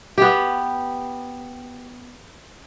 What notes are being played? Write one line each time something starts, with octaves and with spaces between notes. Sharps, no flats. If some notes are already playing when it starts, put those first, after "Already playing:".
B3 G4